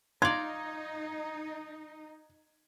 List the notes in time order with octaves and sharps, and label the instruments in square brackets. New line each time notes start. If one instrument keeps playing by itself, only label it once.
[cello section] D#4 [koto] F4 D5 [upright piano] G#6